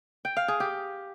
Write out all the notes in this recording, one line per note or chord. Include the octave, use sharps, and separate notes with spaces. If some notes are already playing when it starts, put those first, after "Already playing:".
G5
F5
G#4
G4